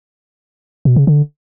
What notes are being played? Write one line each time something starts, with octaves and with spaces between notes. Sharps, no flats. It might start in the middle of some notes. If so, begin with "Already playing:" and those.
B2
C#3
D3